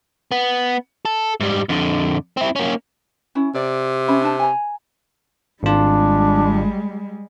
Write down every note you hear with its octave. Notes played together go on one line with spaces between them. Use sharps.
B3
A4
G#2 G3
F2 D3
C4 E4
A#3 C#4
C#4 E4
C3 D5
C#4 E5 B5
D4 D#4 A5
G#5 A#5
G#1 G3 G#3 D4 F4